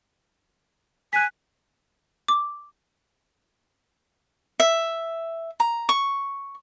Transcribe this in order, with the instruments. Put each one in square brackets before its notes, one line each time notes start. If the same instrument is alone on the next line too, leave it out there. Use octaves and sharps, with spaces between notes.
[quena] G#5 [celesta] F#6 B6
[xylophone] D6
[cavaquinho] E5
A#5
C#6